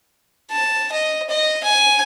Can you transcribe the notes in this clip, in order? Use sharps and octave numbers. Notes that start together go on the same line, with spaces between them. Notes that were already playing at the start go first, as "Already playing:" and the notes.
A5
D#5
D#5
G#5